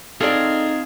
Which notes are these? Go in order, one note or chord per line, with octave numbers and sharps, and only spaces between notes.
C4 D#4 F4 G#4 A4 D5